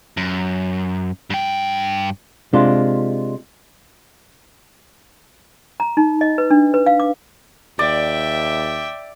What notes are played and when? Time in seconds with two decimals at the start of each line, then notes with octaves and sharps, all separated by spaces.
0.17 F#2
1.30 G2 G5
2.53 C3 G#3 D4 F4
5.80 A#5
5.97 D#4
6.21 D#5
6.38 B4
6.51 D4
6.74 B4
6.86 F5
7.00 D6
7.79 D#2 D5 E5 G5